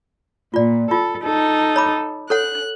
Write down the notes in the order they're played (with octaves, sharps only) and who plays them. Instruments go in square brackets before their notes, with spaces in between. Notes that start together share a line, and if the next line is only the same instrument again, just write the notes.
[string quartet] A#2 [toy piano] F4 D5
[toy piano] F4 [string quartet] A4
[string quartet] D#4 A4
[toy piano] C#5 B5 D6
[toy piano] A4 C#5 F#5 [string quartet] F#6